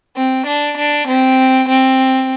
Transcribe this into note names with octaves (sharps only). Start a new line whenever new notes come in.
C4
D4
D4
C4
C4